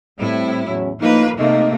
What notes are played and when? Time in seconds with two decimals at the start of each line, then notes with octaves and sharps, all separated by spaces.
0.19 A2 G3 C4 E4
0.65 E2 F#3 C#4
1.00 A2 F3 A#3 D#4 B4
1.38 C3 A3 A#3 D#4 D#5